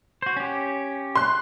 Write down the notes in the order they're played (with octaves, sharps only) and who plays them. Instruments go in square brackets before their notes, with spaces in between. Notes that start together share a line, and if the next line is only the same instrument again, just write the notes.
[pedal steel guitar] F#4 C5
C#4 G4
[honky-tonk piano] C6 F#6